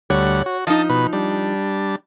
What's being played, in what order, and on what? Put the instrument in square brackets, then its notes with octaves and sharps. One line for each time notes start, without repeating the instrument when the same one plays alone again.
[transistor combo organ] D2 G3 F#5 [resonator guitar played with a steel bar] C#5
[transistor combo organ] F#4
[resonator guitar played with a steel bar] F3 D#4 [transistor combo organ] D#5 A5
[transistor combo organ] B2 B4
G3 D4